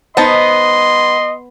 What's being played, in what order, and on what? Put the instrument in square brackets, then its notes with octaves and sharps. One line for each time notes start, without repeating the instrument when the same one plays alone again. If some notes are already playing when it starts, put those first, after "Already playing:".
[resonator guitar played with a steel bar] B3 [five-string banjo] D#4 C5 A5 [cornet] D#5 [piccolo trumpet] C6